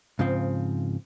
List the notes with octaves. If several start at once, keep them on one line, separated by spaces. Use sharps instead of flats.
G#2 C#3 F3 C4